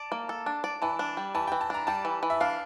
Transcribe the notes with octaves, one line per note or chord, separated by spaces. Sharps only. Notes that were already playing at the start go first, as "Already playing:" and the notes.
Already playing: D5 A5
A#3
A4
D4
D5
E3 A5
D4
G3
E3 A5
E3 G5
A5
D4 A#5
G3 A5
E3
E3
E5
D4 F5